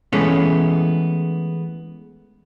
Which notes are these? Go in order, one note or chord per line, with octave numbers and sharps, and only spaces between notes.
E3 G#3 A3 B3 C#4